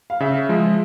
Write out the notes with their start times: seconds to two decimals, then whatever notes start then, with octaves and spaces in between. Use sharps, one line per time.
0.10 F5
0.20 C#3 E5
0.49 F3 G#3